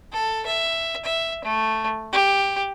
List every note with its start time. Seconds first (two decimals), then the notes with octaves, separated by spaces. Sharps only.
0.13 A4
0.46 E5
1.05 E5
1.45 A3
2.13 G4